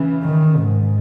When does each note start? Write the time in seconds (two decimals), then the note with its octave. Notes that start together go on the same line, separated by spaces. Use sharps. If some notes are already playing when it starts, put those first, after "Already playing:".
Already playing: C#3 E3
0.23 D#3
0.56 G#2